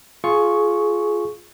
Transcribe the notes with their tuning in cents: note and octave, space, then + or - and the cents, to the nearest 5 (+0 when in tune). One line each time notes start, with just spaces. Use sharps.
F4 +0 G#4 +20 C#6 +0